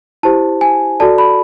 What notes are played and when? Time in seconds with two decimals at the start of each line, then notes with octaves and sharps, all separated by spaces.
0.23 E4 G4 C5 A5
0.61 G#5
1.00 F#4 A4 D5 A5
1.18 B5